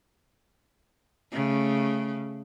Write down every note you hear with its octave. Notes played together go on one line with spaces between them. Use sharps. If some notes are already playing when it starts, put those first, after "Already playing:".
C#3 A3